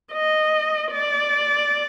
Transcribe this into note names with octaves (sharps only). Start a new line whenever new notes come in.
D#5
D5